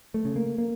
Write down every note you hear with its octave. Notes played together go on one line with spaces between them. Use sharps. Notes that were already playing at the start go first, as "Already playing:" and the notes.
A3
C#3
A#3
A#3